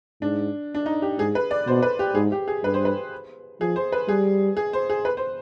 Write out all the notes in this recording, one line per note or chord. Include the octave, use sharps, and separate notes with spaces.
G#2 D4
D4
D#4
G4
G#2 G#4
B4
D5
B2 C5
B4
G4
G#2 G#4
G4
G#4
G2 B4
C5
B4
F3 G#4
C5
B4
G3 G#4
G#4
C5
G#4
B4
C5